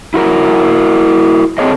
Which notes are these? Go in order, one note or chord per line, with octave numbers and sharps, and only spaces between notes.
E4 F#4 A#4
C4 G#4 A4 C#5 D#5